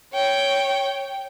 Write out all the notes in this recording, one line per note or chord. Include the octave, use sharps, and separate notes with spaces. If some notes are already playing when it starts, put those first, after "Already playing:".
C#5 G5